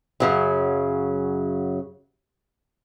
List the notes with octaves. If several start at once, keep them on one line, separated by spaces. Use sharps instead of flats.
F#2 C#3 F#3